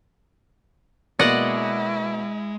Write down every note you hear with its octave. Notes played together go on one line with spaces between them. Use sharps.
B2 G#3 A#3 E4 D5 D#5 F#5